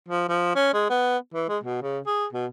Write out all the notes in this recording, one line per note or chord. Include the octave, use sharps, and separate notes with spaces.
F3
F3
C#4
G#3
B3
E3
G#3
B2
C#3
G#4
B2